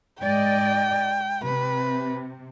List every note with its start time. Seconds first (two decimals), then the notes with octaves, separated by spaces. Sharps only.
0.20 G#2 D5 D#5 G5
1.44 C3 B4